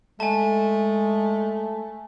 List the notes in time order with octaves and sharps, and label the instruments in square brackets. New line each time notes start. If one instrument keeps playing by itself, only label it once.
[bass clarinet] G#3 [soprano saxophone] A3 [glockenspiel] G#5 A5